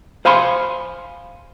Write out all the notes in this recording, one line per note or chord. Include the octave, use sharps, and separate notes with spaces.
C5 F5 G#5 B5 C6